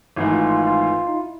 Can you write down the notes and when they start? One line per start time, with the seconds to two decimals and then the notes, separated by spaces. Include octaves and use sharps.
0.16 G#1 G#2 E3 A3 E4
0.33 F4
0.50 F4
0.67 F4
1.07 D#4
1.17 E4